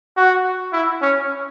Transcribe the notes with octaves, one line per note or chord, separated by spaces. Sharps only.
F#4
E4
C#4